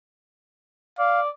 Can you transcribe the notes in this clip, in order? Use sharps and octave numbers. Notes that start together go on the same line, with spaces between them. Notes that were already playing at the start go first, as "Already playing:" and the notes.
D5 F5